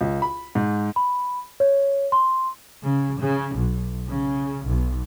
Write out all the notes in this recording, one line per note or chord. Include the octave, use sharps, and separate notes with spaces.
C#2
B5
G#2
B5
C#5
C6
C#3
C#3
B1
C#3
B1